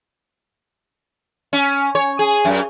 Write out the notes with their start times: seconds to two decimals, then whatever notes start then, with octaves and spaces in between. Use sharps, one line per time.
1.53 C#4
1.95 C#5
2.19 G#4
2.45 F#2